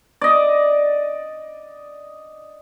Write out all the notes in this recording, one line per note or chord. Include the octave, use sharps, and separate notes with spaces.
D5 D#5